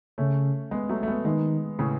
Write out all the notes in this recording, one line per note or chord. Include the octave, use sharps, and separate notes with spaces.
C#3 A3 C#4
G#3 B3
F#3 A3
A3
G#3 B3
D#3 G#3 B3
A2 C#3